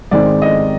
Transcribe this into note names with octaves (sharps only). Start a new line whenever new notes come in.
G#2 D#3 G#3 C4 D5
D#5